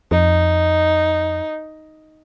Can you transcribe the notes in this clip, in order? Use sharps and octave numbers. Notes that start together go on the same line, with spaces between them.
F2 D#4